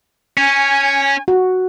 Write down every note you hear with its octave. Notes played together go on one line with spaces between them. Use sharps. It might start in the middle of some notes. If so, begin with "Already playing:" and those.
C#4 G#5
F#4